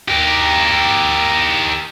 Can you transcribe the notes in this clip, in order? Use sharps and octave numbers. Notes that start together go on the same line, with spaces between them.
G4 A#4